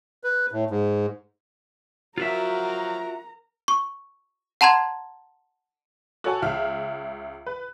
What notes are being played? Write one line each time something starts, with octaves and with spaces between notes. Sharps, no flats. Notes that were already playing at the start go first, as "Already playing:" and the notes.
B4
A2
G#2
F3 F#3 F4 F#4 A#4 E5 A#5
C#6
F#5 A5 A#5 C6 G#6
F#4 A4 C#5 G#5 A5
C#2 E5 F5 F6
B4